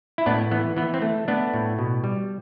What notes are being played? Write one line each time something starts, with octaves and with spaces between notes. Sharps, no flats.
E4
A2 B3 D4
E3 B3
E3 B3
C4
A3
A3 B3 D4
A2
B2
G3